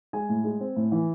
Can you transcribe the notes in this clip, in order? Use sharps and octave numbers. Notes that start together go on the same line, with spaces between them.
G#3 G#5
A2
G#3
C4
A2
E3